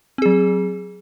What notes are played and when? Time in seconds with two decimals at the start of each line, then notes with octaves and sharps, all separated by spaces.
0.18 C4
0.22 G#4
0.26 F#3